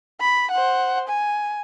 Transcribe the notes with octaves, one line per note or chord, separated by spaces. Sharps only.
B5
C5 F#5
G#5